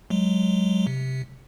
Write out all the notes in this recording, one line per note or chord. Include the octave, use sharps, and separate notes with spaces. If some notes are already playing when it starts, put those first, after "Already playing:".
F#3 G#3
C3